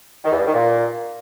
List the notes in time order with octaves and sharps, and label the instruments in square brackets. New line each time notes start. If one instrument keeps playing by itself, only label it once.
[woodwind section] D#3
E2
G2
D#3
A#2